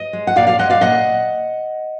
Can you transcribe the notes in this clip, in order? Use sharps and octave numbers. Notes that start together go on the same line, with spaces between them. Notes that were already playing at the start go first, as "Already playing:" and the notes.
Already playing: D#5
G#3
F#5
A#2 D5 F5
D5 F5
G#3 D#5 F#5
D5 F5
A#2 D#5 F#5